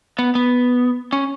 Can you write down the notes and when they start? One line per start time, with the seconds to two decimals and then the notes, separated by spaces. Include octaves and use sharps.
0.19 B3
0.35 B3
1.13 C#4